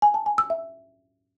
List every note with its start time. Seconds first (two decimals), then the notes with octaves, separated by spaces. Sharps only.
0.02 G#5
0.14 A5
0.26 G#5
0.38 E6
0.50 E5